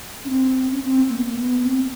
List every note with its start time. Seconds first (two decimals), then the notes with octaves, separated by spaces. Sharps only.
0.25 C#4
0.30 C4
0.72 C#4
0.83 C4
1.09 A#3
1.17 B3
1.25 A#3
1.36 B3
1.63 C4